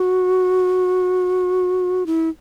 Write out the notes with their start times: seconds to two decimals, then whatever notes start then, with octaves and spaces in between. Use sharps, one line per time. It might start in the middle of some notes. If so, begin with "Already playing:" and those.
Already playing: F#4
2.06 E4